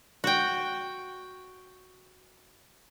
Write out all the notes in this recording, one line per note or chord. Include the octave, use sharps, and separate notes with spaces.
F#4 G5